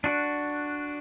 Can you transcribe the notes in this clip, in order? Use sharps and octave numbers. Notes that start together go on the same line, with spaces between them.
D4 F#4